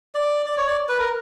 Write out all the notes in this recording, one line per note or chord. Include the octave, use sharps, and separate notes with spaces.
D5
D5
C#5
D5
B4
A#4